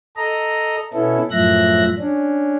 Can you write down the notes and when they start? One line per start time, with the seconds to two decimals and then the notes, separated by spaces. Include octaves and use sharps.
0.16 A4 D#5 A#5
0.93 B2 B3 C#4 E4 A4
1.31 F#2 A2 F3 E5 F#6 A#6
1.98 C#4 D4